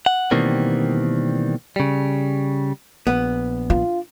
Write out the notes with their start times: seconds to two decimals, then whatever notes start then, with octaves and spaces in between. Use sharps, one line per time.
0.06 F#5
0.31 B2 D#3 E3 G3 A#3 C4
1.76 C#3 G3
3.07 A#1 B3
3.70 D4 F4